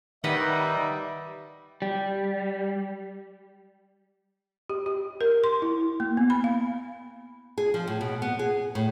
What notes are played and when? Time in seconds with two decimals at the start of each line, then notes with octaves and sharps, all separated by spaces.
0.24 D#3 G3 D#4 B4 D#5 E5 F#5
1.82 G3
4.69 G4
4.86 G4
5.21 A#4
5.44 C6
5.62 E4
6.00 A#3
6.17 B3
6.30 B5
6.44 F5
7.58 G#4
7.74 F3
7.88 A2
8.01 B2
8.22 B3
8.39 G#4
8.75 A2